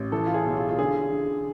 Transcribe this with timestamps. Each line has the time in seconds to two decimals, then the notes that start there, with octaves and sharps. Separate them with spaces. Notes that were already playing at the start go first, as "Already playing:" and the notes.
Already playing: A1
0.12 E3 A4
0.26 F4
0.34 G#4
0.45 B1
0.57 F4
0.69 F4
0.79 D3 G#4
1.12 D3